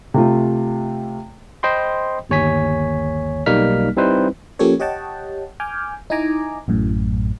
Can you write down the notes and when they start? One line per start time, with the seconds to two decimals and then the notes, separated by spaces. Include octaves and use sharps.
0.14 C3 A3 F4
1.63 C5 D#5 G5 B5 C6
2.30 G1 D#2 C#5 G#5 B6
3.46 B1 G3 A#3 D#4 F6 B6
3.97 G3 C4 D#4 E4 B4 C5
4.59 F3 A#3 C#4 G4 A4 C#5
4.79 G4 C#5 D#5 F#5 G5 A5
5.60 G#5 D6 F6 G6
6.10 D#4 E4 D#5 G#5 A#5 D6
6.68 A1 F#2 A2